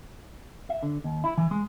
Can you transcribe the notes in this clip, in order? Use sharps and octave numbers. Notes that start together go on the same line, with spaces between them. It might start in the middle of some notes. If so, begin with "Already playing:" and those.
E5
D3
D#2
E4
E3
G#3